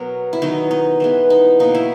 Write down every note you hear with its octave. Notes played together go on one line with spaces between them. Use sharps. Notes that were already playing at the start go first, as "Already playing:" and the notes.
Already playing: B2 F#3 B3 A#4
E4
D#3 F#3 B3 D#4
D#4
E3 G#3 B3
D#4
B2 F#3 A#3 D#4
E4